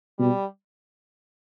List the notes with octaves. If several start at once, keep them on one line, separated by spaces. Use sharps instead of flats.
B2 G3